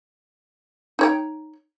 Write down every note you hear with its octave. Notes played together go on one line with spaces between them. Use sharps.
D#4 C#5 G5